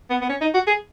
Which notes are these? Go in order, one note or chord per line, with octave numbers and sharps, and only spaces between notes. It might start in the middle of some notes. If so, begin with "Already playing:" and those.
B3
B3
C#4
D#4
F#4
G#4